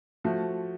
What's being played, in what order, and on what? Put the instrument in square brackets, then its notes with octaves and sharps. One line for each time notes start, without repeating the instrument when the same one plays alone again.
[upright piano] F3 A3 F#4